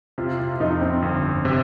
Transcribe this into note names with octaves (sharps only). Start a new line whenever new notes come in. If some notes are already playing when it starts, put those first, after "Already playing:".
C3 F4
F4
F4
F2 D#4
C4
G1
C3